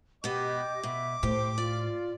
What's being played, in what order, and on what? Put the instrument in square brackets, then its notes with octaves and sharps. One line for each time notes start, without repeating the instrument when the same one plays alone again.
[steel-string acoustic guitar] B2 B3 [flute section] G4 D#5 [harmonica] D6
[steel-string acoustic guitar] B2 [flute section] E5
[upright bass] A2 [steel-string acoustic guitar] G4 [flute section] C5
[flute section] F4 [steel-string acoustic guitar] D5